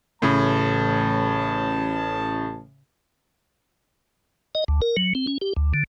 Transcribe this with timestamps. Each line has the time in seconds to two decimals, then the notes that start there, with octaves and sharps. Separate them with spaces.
0.22 A1 A2 C#3 A5
4.55 D#5
4.68 D2
4.82 A#4
4.97 F#3
5.15 C4
5.27 C#4
5.41 G4
5.56 D2
5.74 D3